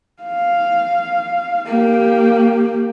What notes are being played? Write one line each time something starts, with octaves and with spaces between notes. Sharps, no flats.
F5
A#3 G4